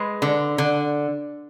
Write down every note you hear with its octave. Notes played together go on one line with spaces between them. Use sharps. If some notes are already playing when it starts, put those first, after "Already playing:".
Already playing: G#3 B4
D3
D3